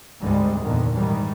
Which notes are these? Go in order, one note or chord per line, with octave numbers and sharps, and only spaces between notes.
G#1 D2 G#2 D3 G3 G#3
E2 G2 A#2 D3 D#3
G#2 D#3 E3 G3